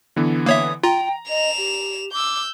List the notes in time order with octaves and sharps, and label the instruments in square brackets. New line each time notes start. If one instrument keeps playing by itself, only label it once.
[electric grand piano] D3 E3 B3
[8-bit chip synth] A#3 C#5 E5 [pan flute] D#6
[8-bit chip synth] F4 [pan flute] G5 [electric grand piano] A#5
[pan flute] D#5 [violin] E7 F7
[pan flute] G4
[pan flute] D6 [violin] E6 G6